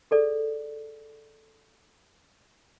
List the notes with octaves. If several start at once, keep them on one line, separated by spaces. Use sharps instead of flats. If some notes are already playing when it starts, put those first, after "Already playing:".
G#4 A4 D5